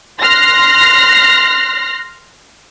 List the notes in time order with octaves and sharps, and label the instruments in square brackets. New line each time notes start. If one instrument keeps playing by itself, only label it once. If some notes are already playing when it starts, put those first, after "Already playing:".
[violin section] C6 F6 F#6 A#6 C7